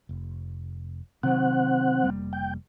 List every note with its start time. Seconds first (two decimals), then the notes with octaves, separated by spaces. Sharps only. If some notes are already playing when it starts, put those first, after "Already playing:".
0.09 F1
1.23 C3 D#3 F#3 C4 F#5
2.03 F1 G3 A#3
2.33 G5